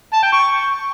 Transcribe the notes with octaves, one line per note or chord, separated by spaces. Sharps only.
A5
G5
C#6